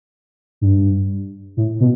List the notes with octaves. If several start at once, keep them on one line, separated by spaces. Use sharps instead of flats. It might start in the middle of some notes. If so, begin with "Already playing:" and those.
G2
A2
B2